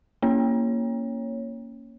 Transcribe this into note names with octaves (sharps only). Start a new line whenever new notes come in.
A#3 C#4 C#5